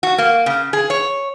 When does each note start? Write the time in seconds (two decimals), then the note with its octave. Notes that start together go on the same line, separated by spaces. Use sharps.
0.03 F#4
0.18 A#3
0.46 C#3
0.73 G#4
0.90 C#5